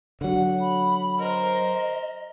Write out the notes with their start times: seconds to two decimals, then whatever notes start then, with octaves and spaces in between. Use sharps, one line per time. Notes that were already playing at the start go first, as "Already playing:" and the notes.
0.21 D3 F#3 F#5
0.60 B5
1.18 A#4 C5 D#5